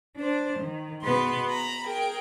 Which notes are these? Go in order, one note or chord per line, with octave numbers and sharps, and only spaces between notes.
D4 C5
D#3
B2 B3 G#4 B4 C6
A#5 B5
G#4 A#4 G5